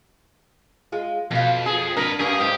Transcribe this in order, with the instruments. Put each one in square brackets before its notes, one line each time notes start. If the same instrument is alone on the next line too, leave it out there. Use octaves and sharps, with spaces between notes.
[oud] G#3 F4
[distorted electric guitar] F2 [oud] B2 F5
[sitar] G#4
[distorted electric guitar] G#2 B4 [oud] D4 [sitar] A#4
[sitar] F#2 A#3 [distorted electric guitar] G#4
[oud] G#2 [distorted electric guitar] G4